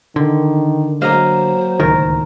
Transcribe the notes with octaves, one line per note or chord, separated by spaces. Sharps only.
D3 D#3
F#3 A#3 C5 D#5 F5
D1 C#2 D#3 A#4